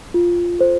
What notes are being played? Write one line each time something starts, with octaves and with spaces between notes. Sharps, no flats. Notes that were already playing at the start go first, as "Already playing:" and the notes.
F4
A4 C5